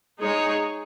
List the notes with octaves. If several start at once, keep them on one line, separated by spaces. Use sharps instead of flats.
G#3 D#4 G#4 C#5